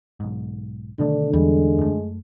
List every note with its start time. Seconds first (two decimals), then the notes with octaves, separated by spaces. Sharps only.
0.20 B1 G#2
0.99 B2 D3 D#3 A3 D4
1.33 E2 G3 G#3
1.78 F#2 A3